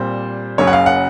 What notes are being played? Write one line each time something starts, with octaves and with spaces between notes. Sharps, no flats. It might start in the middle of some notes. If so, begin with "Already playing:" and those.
Already playing: A#2 G3 C4 C5
F#1 F#2 C#3 C#5
F#5
F5
F#5